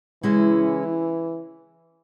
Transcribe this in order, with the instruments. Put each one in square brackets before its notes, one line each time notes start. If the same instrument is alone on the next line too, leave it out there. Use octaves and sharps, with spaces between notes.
[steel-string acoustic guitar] C#3 G#3 C#4 E4 [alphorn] E3